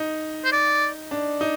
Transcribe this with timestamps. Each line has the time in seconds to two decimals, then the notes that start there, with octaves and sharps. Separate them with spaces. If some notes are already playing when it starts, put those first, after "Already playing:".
Already playing: D#4
0.44 C5
0.52 D5
1.11 D4
1.41 D#4